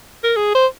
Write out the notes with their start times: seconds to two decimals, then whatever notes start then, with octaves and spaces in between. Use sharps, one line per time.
0.24 A#4
0.37 G#4
0.55 C5